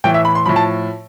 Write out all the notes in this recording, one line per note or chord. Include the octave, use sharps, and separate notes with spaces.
A2 E3 G5
E5
B5
C6
A2 F3 B5
A5